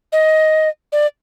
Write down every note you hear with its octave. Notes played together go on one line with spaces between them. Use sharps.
D#5
D5